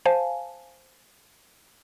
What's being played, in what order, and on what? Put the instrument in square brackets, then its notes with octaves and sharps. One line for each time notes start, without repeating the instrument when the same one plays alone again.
[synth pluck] C5 F5 G#5 A5